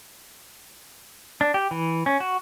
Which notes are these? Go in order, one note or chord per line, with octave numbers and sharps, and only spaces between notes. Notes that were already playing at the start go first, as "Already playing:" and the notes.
D4
G4
E3
C#4
F#4